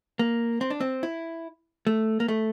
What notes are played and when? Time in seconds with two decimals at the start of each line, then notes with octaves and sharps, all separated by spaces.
0.19 A#3
0.61 C4
0.70 D4
0.81 C4
1.03 E4
1.87 A3
2.20 A#3
2.28 A3